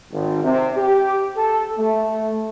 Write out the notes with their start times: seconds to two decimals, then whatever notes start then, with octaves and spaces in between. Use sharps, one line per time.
0.13 G#1
0.43 C3
0.77 G4
1.36 A4
1.77 A3